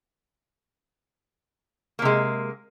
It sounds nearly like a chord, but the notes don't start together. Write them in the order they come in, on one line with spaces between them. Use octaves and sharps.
A#3 C3 G#3